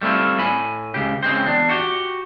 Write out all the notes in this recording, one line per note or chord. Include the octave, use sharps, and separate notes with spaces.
G3 A3 C4 E4 F4
A2 G#5 B5
C#2 C#3 G4
C#3 G#3 C4 C5
E2 D4
F#4 G4